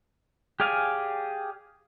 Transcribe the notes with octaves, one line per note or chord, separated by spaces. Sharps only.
G4 G#4 D5 F5 G#5